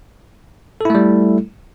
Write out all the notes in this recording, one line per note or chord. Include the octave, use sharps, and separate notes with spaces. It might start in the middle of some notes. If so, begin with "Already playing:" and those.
G3 A3 E4 A4